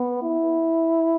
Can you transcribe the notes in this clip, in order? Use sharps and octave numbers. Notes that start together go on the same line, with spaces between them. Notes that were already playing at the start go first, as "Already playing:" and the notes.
Already playing: B3
E4